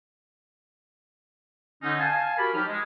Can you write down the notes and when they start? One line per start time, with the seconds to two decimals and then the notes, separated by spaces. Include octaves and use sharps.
1.83 D3 C#4 D#4
1.99 F5 G#5 A5
2.38 F#4 G4 A#4 B5
2.54 F3 F#3 D#4 G4 F6
2.67 G#3